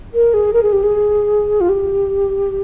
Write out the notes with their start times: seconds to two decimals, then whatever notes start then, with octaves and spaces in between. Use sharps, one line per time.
0.14 A#4
0.34 G#4
0.53 A#4
0.63 G#4
0.73 G4
0.83 G#4
1.61 F4
1.69 G4